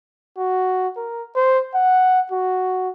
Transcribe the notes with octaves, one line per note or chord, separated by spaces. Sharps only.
F#4
A#4
C5
F#5
F#4